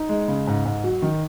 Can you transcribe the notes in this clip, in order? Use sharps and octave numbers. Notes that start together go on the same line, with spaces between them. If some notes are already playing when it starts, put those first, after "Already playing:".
Already playing: D#4
G#3
C#3
G#2
G#2
F#3
D#3